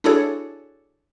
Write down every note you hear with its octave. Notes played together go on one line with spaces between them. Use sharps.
D4 E4 F#4 G#4 A4 C#5